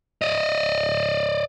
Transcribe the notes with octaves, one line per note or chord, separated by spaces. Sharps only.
D5 D#5